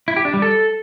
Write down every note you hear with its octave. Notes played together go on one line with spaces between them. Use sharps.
E4
G4
D4
G3
A4